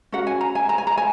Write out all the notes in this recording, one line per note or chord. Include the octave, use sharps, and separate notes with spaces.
C#4 F#4 A#4 F#5
G#5
A#5
G#5
A#5
G#5
A#5
G#5